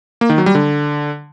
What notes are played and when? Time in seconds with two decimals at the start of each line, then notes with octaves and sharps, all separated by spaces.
0.21 A#3
0.30 D#3
0.38 F#3
0.46 G3
0.55 D3